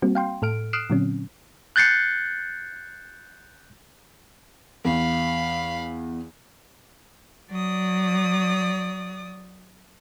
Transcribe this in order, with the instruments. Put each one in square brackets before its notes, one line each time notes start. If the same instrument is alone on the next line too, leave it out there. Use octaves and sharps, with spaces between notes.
[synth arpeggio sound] G3 A#3 C4 F#4
F5 G5 C6
A2 A4 F6 D7
D#6 F6 F#6 C7 D7 E7
A#2 D3 F#3 C4 C#4
[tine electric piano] F#6 G6 A6 C7 C#7
[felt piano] E2 [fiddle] F5 B5
[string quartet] F#3 D5 D#6